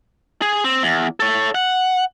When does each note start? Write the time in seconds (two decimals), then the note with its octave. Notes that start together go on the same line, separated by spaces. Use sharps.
0.42 G#4
0.64 C4
0.82 E2
1.20 A4 C#5
1.55 F#5